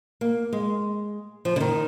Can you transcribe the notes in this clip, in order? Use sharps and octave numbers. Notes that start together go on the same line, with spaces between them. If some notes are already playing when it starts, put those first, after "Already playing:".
A#3
G#3
F3
D3
D#3